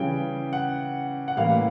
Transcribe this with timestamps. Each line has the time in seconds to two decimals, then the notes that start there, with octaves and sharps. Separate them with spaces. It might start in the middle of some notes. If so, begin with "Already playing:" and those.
Already playing: C#3 E3 G3 G5
0.53 F#5
1.28 F#5
1.37 A2 E3 G3 A#3 F5